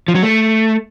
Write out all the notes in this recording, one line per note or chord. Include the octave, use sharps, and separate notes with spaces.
F3
F#3
A3